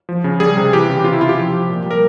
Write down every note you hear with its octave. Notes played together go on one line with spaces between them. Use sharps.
F3
C#3
G3 G#4
C3
E3 G4
C#3
C3 F4
E4
C3 F4
G4
F3
F3
A#2
G3
A#4